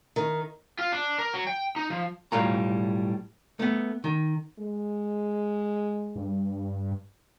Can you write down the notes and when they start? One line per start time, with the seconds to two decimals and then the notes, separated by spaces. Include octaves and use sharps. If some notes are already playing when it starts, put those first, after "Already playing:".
0.16 D#3
0.79 F4
0.92 D4
1.19 A#4
1.34 F#3
1.47 G5
1.76 D#4
1.90 F3
2.32 B1 A2 G3 F4 A#5
3.59 A3 B3
4.04 D#3
4.59 G#3
6.16 G2